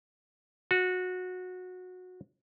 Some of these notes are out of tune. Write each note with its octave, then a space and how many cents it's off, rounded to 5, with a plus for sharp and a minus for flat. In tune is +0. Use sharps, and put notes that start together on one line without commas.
F#4 -20